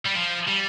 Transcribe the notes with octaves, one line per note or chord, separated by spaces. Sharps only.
G3
F3
G3